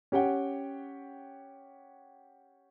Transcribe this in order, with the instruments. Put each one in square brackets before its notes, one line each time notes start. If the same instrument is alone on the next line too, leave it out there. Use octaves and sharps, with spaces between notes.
[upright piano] C#4 G4 F#5 G5